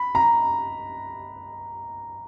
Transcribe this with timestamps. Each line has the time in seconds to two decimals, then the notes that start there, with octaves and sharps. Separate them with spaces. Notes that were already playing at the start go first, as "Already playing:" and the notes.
Already playing: B5
0.15 A#5